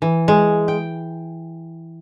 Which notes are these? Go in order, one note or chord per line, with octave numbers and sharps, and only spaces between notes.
E3
G#3
G5